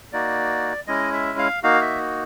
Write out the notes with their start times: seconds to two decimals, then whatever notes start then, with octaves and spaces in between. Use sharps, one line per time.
0.13 A#3 D#4 F#4 D5
0.87 G#3 C#4 E4 D#5
1.13 E5
1.39 F5
1.63 A#3 D#4 F#4 F5
1.81 E5